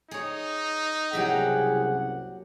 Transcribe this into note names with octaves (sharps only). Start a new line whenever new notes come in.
D#4 G#4 C#5
F#1 C2 F#3 G4 G#4 E5 F#5